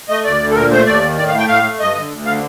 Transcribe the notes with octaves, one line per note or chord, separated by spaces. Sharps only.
A3 D#5
D2 D5
D3
A4
A#2 A#4
A3 C5
D#2 D5
D#3
A2 D5
F5
A3
G5
A2 F5
A3
G2 D#5
D3
D2
D3 F5